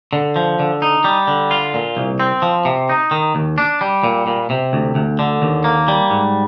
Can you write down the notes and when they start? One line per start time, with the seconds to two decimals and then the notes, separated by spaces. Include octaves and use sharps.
0.13 D3
0.36 F3
0.59 D3
0.82 D#4
1.04 G3
1.27 D3
1.51 F4
1.74 A#2
1.97 C2
2.20 C4
2.42 F3
2.65 C3
2.89 D#4
3.11 D#3
3.35 D#2
3.58 D4
3.81 G3
4.04 A#2
4.27 A#2
4.50 C3
4.73 D2
4.95 D2
5.19 D3
5.42 D#2
5.64 A#3
5.88 G3
6.10 G#2